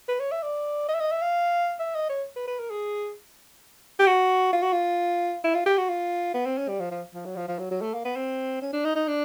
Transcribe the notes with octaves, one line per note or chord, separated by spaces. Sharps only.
B4
C#5
E5
D5
D#5
E5
D#5
E5
F5
E5
D#5
C#5
B4
B4
A#4
G#4
G4
F#4
F4
F#4
F4
E4
F4
G4
F#4
F4
B3
C4
C#4
G3
F3
F3
F3
F#3
F3
F3
F#3
F#3
A3
A#3
B3
C4
C#4
D4
D#4
D#4
D4